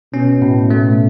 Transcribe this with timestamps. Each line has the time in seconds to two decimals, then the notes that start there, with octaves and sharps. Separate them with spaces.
0.14 B2 C#4
0.42 A2
0.70 A3